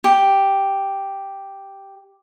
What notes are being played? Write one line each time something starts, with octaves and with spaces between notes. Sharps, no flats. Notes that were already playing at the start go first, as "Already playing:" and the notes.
G4